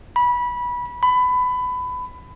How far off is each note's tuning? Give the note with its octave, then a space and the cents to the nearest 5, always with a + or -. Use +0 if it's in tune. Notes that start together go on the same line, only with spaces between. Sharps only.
B5 -20
B5 +20